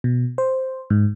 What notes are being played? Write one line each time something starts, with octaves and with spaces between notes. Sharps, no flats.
B2
C5
G#2